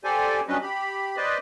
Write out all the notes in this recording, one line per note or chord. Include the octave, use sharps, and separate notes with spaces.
G4 A4 C5 D5 G#5
F#3 G3 C#4 D4 B4 D#5
G4 B5
B4 C5 D5 D#5